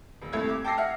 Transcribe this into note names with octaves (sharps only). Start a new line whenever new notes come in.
D#1
C2 A3 G#6
D6
G5 A5 D6 E6 A#6 C7
E5 F#5 F6